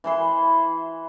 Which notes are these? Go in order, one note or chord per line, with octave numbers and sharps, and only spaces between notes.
E3 E4 C6